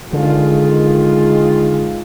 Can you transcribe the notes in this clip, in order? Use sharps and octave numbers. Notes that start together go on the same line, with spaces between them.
D3 D#3 G#3 F4